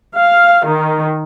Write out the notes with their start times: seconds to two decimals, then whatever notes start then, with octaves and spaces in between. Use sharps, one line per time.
0.16 F5
0.66 D#3